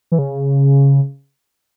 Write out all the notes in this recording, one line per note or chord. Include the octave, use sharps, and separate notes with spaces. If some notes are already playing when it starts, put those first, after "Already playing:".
E3
C#3